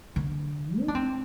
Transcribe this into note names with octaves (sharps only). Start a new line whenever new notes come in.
D3
D#4
D4
C4